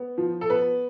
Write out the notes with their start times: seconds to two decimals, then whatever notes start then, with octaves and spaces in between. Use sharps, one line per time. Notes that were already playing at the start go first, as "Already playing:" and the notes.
Already playing: B3
0.18 F3
0.41 A4
0.50 B3 B4